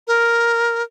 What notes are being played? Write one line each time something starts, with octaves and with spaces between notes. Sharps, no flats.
A#4